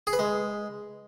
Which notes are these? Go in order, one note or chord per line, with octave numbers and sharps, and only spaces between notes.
G#4
B4
G#3